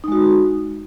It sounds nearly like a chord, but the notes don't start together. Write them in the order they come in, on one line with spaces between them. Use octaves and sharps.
D#4 G#3 F#4